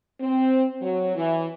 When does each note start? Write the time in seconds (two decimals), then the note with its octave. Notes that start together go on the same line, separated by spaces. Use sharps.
0.21 C4
0.81 F#3
1.16 E3